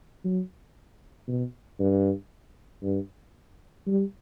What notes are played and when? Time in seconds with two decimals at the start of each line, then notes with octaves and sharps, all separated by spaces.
0.24 F#3
1.28 B2
1.80 G2
2.83 G2
3.87 G3